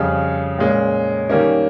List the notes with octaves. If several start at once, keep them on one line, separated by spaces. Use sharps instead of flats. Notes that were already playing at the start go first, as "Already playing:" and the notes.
Already playing: F2 C#3 G3
A#2 G#3 C#4
D#3 G3 A#3 C#4